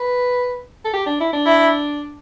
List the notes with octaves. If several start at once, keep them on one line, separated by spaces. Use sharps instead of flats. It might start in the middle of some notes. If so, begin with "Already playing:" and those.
Already playing: B4
A4
G4
D4
E4
D4
E4